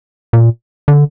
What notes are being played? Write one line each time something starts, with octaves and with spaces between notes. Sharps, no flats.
A#2
D3